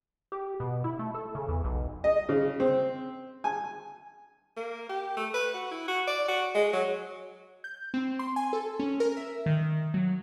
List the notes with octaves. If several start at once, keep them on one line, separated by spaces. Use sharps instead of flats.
G4
B2
E4
A3
A4
C#3
E2
B1
D#5
C#3
C4
G#5
A#3
G4
A3
B4
F#4
E4
F#4
D5
F#4
G#3
F#3
G6
C4
C6
G#5
A4
C#4
A#4
E5
D#3
F#3